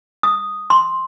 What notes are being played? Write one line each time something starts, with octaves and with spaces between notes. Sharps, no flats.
D#6
C6